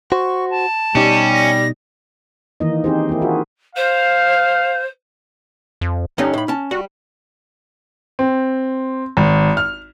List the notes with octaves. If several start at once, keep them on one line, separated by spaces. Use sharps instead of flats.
F#4 C5 C#6
A5
B2 G3 C#4 D#4 D5
A#6
D#3 E3 A#3 D#4 D#5
C4 C#4 D#4 G4 G#4 C5
A#3 E4
F4 F#4 G#4
C5 F5
F2
G2 D3 C#4 D#4
A2 B5
C#4 A5
G3 F#4
C4
G#1
F6